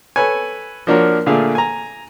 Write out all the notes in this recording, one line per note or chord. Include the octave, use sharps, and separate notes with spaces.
A4 B4 C#5 G#5
F3 A#3 D4 F#4 A#4 C#5
A#2 D3 A3 D4 G#4 F5
G#5 A#5